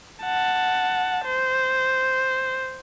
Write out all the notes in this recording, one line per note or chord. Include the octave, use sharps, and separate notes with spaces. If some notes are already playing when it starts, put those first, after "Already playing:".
F#5 A5
C5